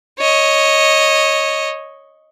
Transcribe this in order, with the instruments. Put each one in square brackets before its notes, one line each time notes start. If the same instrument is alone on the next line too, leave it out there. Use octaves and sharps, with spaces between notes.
[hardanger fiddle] C#5 D#5